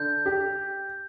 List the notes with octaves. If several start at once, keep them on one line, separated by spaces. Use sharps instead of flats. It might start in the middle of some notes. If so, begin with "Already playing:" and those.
Already playing: D3 G6
G4